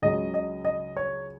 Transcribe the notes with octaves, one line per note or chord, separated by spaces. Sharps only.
C#2 C#3 F#3 D#5
D#5
D#5
C#5